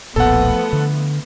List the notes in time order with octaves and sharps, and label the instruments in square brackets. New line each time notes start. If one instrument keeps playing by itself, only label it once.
[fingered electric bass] E1 B1 A#2 [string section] F3 A3 B3 [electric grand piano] A4 F#5
[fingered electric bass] D3